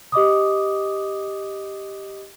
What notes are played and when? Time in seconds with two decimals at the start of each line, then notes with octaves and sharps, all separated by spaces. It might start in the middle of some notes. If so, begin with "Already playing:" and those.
0.12 G4 D#5 D6 D#6